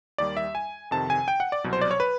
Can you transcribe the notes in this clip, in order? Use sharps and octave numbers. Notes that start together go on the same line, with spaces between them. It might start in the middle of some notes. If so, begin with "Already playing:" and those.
D#2 D#3 G3 D5
E5
G#5
F2 C3 D#3 A5
G#5
G5
F#5
D5
C2 B2 F#3
C5
D5
C#5
B4